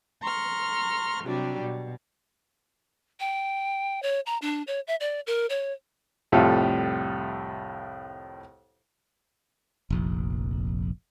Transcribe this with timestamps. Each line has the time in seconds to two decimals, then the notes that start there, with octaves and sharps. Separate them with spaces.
0.21 A#5 C6 C#6 F6
1.24 C3 F#3 G3 D4
1.60 B2
3.20 G5
4.03 C#5
4.26 A#5
4.42 D4
4.67 C#5
4.87 E5
5.01 D5
5.27 A#4
5.50 C#5
6.32 C2 F2 A2 G3 F4 A4
9.90 F1 A#1